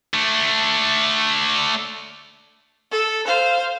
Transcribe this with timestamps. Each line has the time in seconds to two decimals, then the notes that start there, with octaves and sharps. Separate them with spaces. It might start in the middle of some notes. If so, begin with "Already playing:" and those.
0.14 A3 D4
2.91 A4
3.27 C5 F5